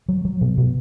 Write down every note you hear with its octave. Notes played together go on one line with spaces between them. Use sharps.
F#3
F#3
B2
B2